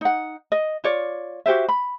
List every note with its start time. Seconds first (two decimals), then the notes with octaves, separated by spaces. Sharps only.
0.01 D#4 F#5
0.52 D#5
0.84 F4 C#5 D5
1.46 F#4 G4 C5 E5
1.69 B5